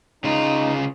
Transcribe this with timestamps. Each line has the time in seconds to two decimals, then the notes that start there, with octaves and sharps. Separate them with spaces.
0.24 C#3 D#4 F4